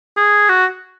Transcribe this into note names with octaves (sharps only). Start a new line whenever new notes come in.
G#4
F#4